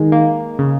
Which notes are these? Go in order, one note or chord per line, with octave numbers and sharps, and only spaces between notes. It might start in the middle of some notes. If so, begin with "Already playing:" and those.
Already playing: D#3 G#3
A#3
C#3